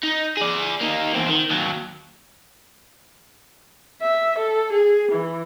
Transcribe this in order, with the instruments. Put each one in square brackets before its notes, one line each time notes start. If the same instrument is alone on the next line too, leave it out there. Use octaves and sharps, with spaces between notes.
[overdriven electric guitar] D#4
G#4 D5
A#3 D#4
E2 C4
D#3
D#2 F#3
[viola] E5
A4
G#4
E3